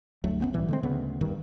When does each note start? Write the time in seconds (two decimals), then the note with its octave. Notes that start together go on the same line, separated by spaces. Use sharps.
0.24 G1 D2 F#3 A3
0.41 F#1 A#2 B3 C#4
0.53 B1 A2 E3 G3
0.68 D3 G#3 C4
0.83 D2 C#3 B3
1.21 D#1 G#1 G2 D#3